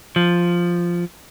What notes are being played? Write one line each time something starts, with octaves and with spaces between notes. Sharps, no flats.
F3